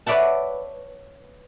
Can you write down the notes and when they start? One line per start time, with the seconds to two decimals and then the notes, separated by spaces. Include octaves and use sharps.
0.06 B4 C#5 D5 E5 F#5 A5